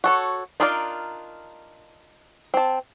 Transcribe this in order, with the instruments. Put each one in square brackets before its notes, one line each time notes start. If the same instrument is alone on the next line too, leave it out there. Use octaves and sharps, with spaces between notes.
[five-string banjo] F#4 A4 C#5
D4 D#4 F4 A#4 D5
C4 A5